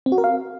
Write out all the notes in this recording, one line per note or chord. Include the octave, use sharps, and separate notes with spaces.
C4
F#4
A#4
F5